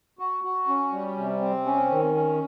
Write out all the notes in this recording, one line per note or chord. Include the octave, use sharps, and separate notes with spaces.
F#4
F#4
C#4
G3
C3
C4
C#4
D#3
C#4